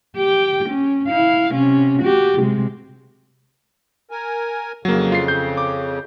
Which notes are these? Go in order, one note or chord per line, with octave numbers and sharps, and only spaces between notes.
G4 G5
C#4
E4 F5
C3 C#4
F#4 G4
C3 G#3
A#4 G#5
F2 C#3 F#3 A#3
F4 C7
G6
D6